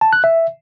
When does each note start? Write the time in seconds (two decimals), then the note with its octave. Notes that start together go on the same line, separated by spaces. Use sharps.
0.01 A5
0.13 F#6
0.24 E5